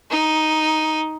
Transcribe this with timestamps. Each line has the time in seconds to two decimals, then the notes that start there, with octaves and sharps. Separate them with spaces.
0.11 D#4